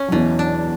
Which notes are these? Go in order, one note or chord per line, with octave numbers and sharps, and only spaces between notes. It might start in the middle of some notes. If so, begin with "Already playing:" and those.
Already playing: C#4
F#3
E2 B2 E3
D4